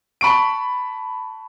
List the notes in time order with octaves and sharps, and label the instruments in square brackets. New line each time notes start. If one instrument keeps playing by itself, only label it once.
[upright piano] A5 B5 C#6 D7